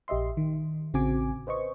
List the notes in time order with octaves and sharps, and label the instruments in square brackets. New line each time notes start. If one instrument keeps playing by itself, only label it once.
[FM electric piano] A#1 G4 D#5 E5 C6
D#3
A1 C#3 C4 F#4 G#5 D6
B4 C5 D#5 C#6